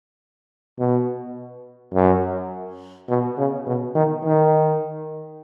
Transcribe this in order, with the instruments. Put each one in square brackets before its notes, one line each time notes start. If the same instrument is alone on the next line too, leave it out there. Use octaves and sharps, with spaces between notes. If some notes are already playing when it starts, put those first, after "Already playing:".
[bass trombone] B2
F#2
B2
C#3
B2
D#3
D#3